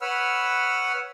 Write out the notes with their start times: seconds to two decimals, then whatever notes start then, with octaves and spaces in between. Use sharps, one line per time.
0.01 B4 C#5 F#5 B5 E6 F6